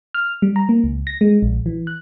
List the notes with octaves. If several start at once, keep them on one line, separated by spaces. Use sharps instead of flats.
F6
G3
A#5
A#3
C#2
A#6
G#3
A#1
E3
F#6